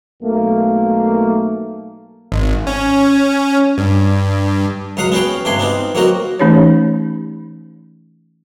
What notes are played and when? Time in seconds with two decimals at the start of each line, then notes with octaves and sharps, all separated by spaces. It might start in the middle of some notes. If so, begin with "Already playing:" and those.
0.22 B1 A3 A#3
2.32 G#1
2.67 C#4
3.78 G2
4.97 C#2 F#3 F5 F#5 D#6
5.12 B3 C#4 F#4 B4 F5 G5
5.45 G2 C3 G4 G#5 C6
5.59 B3 C4 D#4 F4
5.95 F#3 A#3 C4 F#4 A#4 D#5
6.39 E3 A3 C#4 D#4 G4 C#5